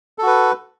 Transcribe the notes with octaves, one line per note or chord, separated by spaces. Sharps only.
F#4 A4 B4